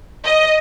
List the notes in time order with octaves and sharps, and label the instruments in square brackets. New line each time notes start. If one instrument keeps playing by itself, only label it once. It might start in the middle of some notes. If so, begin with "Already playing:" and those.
[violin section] D#5